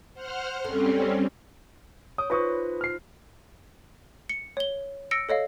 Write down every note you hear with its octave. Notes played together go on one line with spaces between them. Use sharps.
C5 F#5 F6
G2 G3 C4 C#4 A4
C#5 D#6
D#4 F4 B4 C5 C#6 D#6
F6 C7
C#7
C#5 G7
E6 A#6 C#7 D7
A4 C#5 D#5 F5